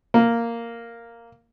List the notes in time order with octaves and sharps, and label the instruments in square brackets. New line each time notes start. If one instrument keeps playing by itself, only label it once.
[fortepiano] A#3